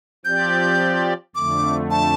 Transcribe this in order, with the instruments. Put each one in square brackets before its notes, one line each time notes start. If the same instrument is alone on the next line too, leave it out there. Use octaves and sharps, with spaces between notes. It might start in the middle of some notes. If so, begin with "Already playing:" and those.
[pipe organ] F3 C4 G4 D5 [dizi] G6
[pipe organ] F2 D3 A3 [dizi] D6
[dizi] A5